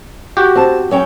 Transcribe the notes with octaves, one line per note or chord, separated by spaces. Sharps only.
F#4 G4
C4 A5
F#3 C#4 G5